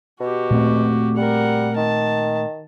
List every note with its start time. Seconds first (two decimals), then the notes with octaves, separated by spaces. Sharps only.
0.20 B2 F#4 G4
0.51 A#2 A3 C4
1.17 G3 A#4 F#5
1.76 D#3 A5